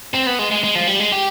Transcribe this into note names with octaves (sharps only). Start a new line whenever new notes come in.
C4
B3
G#3
G#3
G#3
F3
G3
G#3
G4